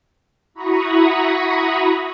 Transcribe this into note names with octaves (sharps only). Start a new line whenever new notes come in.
E4 F#4 A#5 B5 C#6 D#6